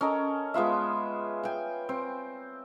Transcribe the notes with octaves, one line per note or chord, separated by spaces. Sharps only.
C#4 A4 A#4 D#5
G#3 B3 F4 E5
G5 G#5
C4